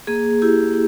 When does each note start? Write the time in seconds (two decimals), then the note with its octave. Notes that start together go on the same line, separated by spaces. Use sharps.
0.07 A#3 G#4
0.42 E4 G4